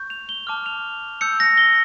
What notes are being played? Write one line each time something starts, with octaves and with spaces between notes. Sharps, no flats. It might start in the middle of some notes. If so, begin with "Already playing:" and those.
Already playing: C#6 G6
F7
G7
A5 D6 F6
F7
A5 E6 G6 C#7
A#6
G7